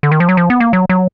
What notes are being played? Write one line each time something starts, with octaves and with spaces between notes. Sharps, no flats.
D3
D#3
F3
F#3
F3
B3
A#3
F#3
F#3